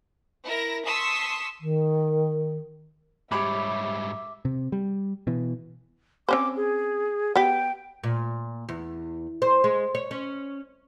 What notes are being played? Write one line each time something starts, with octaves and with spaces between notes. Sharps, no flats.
E4 A#4 A#6
A5 C6 C#6 D#6 E6 B6
D#3
G#2 G3 G4 C#5 E5 B5 D6
C3
G3
B2 E3
C4 C#4 C5 D6
G#4
B3 G4 G5
A#2
E2
C5
G#3
C#5
C#4